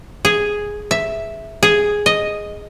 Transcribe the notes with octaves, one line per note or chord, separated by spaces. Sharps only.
G#4
E5
G#4
D#5